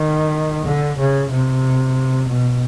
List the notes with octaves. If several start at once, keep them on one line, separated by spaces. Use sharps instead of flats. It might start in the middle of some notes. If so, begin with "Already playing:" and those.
Already playing: D#3
D3
C#3
C3
B2